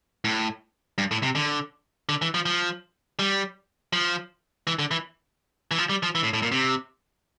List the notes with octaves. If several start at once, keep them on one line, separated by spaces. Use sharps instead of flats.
A2
G2
A2
C3
D3
D3
E3
F3
F3
G3
F3
E3
D3
E3
E3
F3
G3
F3
E3
A2
A2
A#2
C3